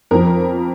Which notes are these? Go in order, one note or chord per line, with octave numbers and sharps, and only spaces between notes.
F2 F3 A#4